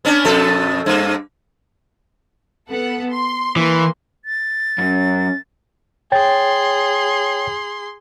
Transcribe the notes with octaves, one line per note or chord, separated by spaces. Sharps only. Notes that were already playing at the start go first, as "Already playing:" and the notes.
B3 C#4 D4
F2 B2 A4
G2 A#3
B3 A4 F#5
C6
E3 A#3 B4 C6
A6
F#2 C#4
G#4 C#5 G5 C6 A6